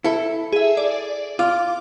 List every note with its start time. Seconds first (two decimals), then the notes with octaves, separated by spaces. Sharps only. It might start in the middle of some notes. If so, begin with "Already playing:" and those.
0.04 E4 A4
0.52 G#4 E5
0.77 D5
1.39 F4 D6